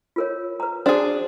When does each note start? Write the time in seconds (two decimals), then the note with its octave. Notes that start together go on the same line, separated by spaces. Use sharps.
0.16 F4 A#4 C#5
0.60 B4 A#5
0.86 D4 F#4 G#4 C5